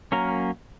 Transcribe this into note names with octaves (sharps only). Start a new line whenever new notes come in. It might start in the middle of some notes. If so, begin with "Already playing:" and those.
F#3 A#3 C#4 A#4